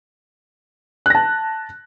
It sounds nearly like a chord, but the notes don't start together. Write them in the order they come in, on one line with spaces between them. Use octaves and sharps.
F#6 A#6 A5